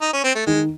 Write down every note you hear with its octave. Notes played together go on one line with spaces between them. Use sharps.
D#4
C#4
C4
A3
D#3 G#3